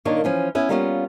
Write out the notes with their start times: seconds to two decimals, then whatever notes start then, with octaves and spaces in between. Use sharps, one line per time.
0.05 A#2 D#3 A#3 D4 F4 C#5
0.24 E3 F3 C#4
0.55 B3 C#4 E4
0.69 G3 A#3 B3 C#4 D4 F4